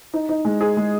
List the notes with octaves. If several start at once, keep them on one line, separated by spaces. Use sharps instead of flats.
D#4
D#4
G#3
G#4
G#3